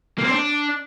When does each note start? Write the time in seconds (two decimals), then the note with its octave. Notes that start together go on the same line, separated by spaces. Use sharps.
0.18 A#3
0.24 C4
0.31 D4